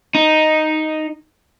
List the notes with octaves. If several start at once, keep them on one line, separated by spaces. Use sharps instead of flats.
D#4